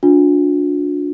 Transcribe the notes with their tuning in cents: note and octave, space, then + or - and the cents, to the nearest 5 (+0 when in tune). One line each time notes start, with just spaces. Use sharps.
D4 -15 F4 +45